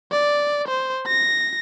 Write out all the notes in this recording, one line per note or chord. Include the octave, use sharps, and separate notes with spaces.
D5
C5
A#6